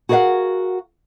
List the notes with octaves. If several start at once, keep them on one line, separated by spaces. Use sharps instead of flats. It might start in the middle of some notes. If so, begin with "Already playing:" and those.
F#4 G#4 A#4 C#5 F5 F#5